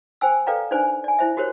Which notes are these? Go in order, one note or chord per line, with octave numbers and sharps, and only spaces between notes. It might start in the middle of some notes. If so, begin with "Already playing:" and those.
C5 G5 G#5 E6
A4 B4 D5 F5 G5 A#5
D4 D#4 B4 C5 D5 G#5
D5 G#5
E4 C5 E5
F#4 G4 A#4 C5 C#5